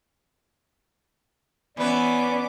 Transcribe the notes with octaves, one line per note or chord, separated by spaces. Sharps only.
E3 B3 C#4 B4 D5 D6